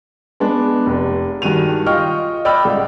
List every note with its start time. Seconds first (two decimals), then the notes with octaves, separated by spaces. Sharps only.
0.40 G#3 B3 D4
0.86 F1
1.42 G2 D#3 G#3 F#4 D#7 F7
1.86 F4 D#5 G5 C#6 F6
2.45 D5 D#5 G5 B5 E6 F6
2.65 C#2 G#2